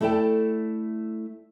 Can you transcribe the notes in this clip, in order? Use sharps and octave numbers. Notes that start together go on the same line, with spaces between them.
A3 E4 A4 D5 G5 A5